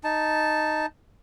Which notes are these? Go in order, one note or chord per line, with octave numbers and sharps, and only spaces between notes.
D#4 A5